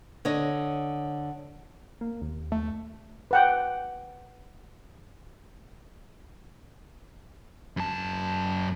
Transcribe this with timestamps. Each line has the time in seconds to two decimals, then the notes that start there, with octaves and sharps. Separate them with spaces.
0.25 D3 C#5 D#5
2.01 A#3
2.21 D#2
2.52 A3
3.31 B4 F#5 G5
7.77 F#2 A5